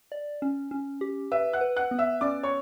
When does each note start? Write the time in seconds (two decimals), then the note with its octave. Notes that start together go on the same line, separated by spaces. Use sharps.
0.12 D5
0.42 C#4
0.71 C#4
1.01 G4
1.32 B4 E5 E6
1.53 F#5 F#6
1.61 B4
1.76 F#5 F#6
1.91 B3
1.99 E5 E6
2.21 C#4 D5 D6
2.43 C#5 C#6